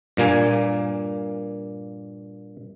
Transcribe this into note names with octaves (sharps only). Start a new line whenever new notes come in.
G2 A#2 A#3 G#5